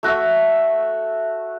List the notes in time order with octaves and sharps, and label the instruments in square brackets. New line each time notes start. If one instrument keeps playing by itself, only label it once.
[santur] A3 F#4 A4 E5